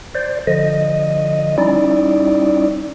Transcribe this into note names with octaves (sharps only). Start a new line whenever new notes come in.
C5 D5
D3 F3 D#5
G3 C#4 D#4 E4 D5